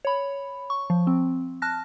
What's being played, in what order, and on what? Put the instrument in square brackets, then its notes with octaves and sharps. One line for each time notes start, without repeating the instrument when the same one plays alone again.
[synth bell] C#5 B5
C#6
F3
C4
A5 F6 F#6 A#6